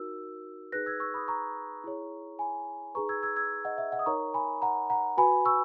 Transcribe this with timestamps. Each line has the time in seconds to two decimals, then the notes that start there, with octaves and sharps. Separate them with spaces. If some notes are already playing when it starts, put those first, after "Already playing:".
Already playing: D#4 F#4 A#4 E6
0.72 D#4 G#4 B4 F#6 A#6
0.86 E6 G#6
1.00 C#6 E6
1.14 B5 D#6
1.28 A#5 C#6
1.84 E4 G#4 C#5
2.39 G#5 B5
2.95 D#4 G#4 B4 A#5 C#6
3.09 E6 G#6
3.23 E6 G#6
3.36 E6 G#6
3.65 D#5 F#5
3.78 E5
3.92 D#5 F#5
3.99 D#6
4.06 D#4 A#4 C#5 A#5 C#6
4.34 G#5 B5
4.62 F#5 A#5
4.90 F#5 A#5
5.17 F#4 B4 G#5 B5
5.45 C#6 E6